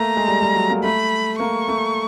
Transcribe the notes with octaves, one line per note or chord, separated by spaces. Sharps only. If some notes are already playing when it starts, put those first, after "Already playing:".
Already playing: A3 A#3 A#5
G#3
G3
G3
F#3
A#3
A3 B5
A#3 C#6
A3